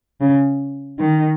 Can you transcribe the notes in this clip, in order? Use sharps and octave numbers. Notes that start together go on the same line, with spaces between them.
C#3
D#3